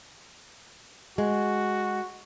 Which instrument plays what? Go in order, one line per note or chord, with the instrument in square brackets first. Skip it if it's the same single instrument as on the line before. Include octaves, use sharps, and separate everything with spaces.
[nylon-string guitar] G#3 [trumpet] F#4